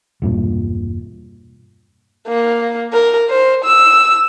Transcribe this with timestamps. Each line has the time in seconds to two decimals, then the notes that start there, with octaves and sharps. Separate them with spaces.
0.22 E1 G2 A#2
2.28 A#3
2.93 A#4
3.30 C5
3.65 E6